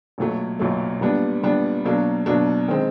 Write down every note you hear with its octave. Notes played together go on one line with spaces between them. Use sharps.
B1 A#2 F#3 A3
B1 A#2 F#3 A3
A#2 G3 B3 D4
A#2 G3 B3 D4
B2 F#3 A#3 D4
B2 F#3 A#3 D4
D#3 G#3 C4